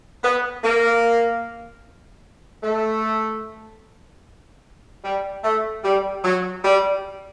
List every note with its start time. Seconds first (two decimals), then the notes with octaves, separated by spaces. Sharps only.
0.23 B3
0.64 A#3
2.63 A3
5.05 G3
5.44 A3
5.84 G3
6.24 F#3
6.64 G3